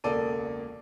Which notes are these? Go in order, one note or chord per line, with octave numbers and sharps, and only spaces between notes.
E1 C#2 A#3 A4 D5 D#7